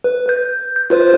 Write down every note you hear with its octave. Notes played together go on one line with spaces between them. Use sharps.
B4
G6
F4 B4 C5